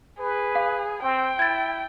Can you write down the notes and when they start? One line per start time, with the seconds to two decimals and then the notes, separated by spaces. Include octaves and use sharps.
0.20 G#4 B4
0.55 F5
1.02 C4 G5
1.39 E4 G#6 A6